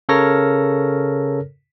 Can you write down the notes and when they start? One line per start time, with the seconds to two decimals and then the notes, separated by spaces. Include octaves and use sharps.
0.09 C#3 A4 A#4 C#5 F6 A#6